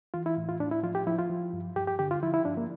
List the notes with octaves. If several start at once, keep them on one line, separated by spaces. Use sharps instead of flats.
E3 F4
E4
A2
F4
A2 D4
E4
F3 F4
G4
F3 E4
F4
F3
G2
G2 G4
G4
D3 G4
F4
F3 E4
E4
G2 D4
A#3